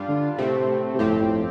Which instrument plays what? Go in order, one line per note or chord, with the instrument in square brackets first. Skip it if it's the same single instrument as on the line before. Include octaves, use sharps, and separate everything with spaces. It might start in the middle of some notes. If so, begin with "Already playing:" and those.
Already playing: [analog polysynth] G2 G3 D4 F4
[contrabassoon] D3
[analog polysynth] A2 A3 C4 [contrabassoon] C3
[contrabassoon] C3
[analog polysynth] G1 F2 F3 C4 G4 [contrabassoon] A2